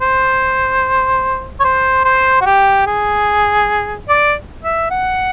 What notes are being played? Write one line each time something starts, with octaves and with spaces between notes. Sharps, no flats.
C5
C#5
C5
C5
F#4
G4
G#4
D5
E5
F#5